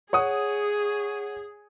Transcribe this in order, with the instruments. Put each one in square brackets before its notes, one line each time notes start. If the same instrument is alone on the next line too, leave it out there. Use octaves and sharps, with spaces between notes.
[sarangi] G#4 [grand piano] C#5 F#5 D#6